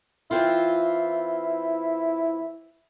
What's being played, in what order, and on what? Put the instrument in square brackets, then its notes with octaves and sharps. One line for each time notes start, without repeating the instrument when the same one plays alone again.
[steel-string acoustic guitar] E3 C4 F4 [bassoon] E4